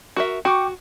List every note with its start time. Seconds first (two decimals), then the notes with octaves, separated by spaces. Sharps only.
0.16 F#4 A#4 E5
0.45 F#4 G5 C#6 D6